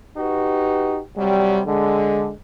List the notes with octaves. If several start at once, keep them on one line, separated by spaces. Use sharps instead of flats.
D#4 F#4 G4 B4
C3 F#3 G3
D3 G#3